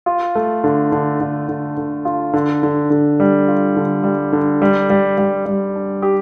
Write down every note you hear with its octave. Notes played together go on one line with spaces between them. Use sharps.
F4
A3
D3
D3
D3
D3
D3
F4
D3
D3
D3
G3
F4
D3
G3
D3
G3
G3
G3
G3
D4
G4